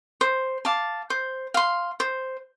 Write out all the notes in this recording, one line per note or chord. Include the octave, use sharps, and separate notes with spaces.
C5
F5 A5 D6
C5
F5 C6
C5